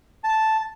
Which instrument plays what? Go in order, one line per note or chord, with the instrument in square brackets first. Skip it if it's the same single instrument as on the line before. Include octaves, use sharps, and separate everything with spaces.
[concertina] A5